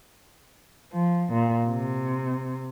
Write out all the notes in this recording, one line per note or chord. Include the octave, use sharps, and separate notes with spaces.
F3
A#2
C3